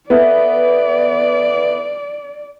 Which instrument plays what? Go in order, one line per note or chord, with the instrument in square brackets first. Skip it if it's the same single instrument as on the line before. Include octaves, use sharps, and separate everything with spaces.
[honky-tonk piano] B3 [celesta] A4 E5 [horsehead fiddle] D5